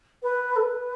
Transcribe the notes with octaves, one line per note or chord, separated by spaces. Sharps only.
B4
A4
B4